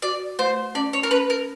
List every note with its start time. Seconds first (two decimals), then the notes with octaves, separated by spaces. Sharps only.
0.02 F#4 D5
0.39 A3 C5
0.75 C#4 D5
0.93 C#5
1.03 A#4
1.11 C#4 B4
1.30 A#4